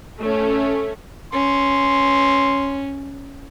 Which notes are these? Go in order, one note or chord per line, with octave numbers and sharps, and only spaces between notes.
A3 C#4
C#4 C6